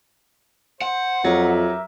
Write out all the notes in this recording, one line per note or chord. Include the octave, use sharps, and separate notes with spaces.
C5 F#5
F2 F#3 G4 A#4 E5